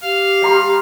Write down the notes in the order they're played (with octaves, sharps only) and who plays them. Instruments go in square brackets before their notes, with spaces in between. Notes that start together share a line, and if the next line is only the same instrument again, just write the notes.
[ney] G4 [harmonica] F5
[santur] G3 A#5 C6